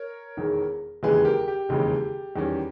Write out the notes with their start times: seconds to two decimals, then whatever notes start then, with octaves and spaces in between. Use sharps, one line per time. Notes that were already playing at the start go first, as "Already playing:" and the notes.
Already playing: A#4 C#5
0.37 E1 E2 D#3
1.03 E1 D#2 C#3 E3 G#3 G#4 B4
1.25 G4 A#4
1.48 G4
1.69 E1 D#2 C#3 E3 G#3
2.36 E2 D#3 G3 C#4